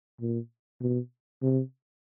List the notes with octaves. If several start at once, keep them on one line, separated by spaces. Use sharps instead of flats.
A#2
B2
C3